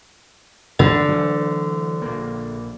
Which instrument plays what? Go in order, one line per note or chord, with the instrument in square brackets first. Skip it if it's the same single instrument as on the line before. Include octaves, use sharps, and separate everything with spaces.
[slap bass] G#2 E3 G#3 [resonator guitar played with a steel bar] D3
[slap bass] E3 F#3 A3
A#1 A#3